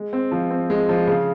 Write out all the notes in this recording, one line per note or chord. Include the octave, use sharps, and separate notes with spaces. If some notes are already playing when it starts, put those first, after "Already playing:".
Already playing: G#3
C4
F3
C4
G#3
F3
C#3